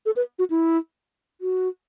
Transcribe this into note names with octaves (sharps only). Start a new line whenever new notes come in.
A4
B4
F#4
E4
F#4